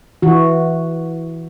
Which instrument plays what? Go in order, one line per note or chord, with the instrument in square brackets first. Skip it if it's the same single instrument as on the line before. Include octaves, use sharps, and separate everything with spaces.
[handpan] E3 F#4